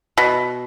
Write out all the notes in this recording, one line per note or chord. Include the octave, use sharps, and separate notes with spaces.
B2